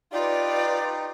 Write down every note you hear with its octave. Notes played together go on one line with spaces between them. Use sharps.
D#4 F4 G4 B4 D5